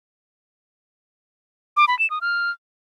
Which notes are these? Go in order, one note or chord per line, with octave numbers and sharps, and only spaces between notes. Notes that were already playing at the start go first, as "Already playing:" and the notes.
D6
B5
E7
D#6
F6